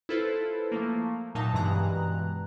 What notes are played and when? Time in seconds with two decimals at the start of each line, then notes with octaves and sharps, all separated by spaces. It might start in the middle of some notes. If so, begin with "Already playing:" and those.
0.09 E4 F4 A4 B4 C5
0.72 F3 A3 A#3
1.35 A#2 F#3 D#4 E5 A5
1.53 G2 B2 E3 G#3 A#5 F#6